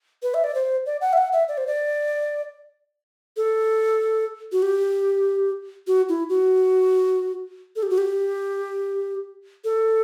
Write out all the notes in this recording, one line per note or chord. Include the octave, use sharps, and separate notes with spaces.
B4
E5
D5
C5
D5
F#5
E5
F#5
E5
D5
C5
D5
A4
F#4
G4
F#4
E4
F#4
A4
G4
F#4
G4
A4